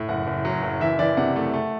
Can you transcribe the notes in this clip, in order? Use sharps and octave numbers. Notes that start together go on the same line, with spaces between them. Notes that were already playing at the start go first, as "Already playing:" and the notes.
Already playing: A2
F#1 F#5
F#1
F#3
F#1
E3 E5
E3 D5
C3 F#5
A3
A3